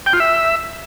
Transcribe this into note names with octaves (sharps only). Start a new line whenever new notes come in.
G5
F4
E5